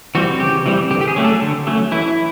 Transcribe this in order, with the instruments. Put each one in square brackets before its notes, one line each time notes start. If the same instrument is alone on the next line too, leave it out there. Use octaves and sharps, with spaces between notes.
[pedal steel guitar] E3 G3 C4 F#4
C#3 G4
E3 G3 C4
D3 G4
G4
G#4
F#3 A3 C#4
A4
D3
F#3 A3 C#4
E3 E4